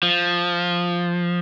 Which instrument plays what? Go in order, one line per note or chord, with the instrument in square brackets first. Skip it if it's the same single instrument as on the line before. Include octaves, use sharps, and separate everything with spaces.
[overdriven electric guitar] F3